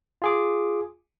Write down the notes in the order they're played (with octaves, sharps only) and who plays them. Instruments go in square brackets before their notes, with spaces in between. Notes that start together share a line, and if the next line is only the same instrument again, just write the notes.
[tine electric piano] F4 G#4 D6